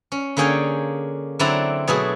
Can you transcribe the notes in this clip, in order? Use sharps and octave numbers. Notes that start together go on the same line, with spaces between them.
C#4
D3 A#3 C#4 G#4 G5 G#5
D3 F#3 C4 E4 D5 A#5
B2 F#3 A3 E4 G#4